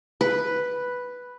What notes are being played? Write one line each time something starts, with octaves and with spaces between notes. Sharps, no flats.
B4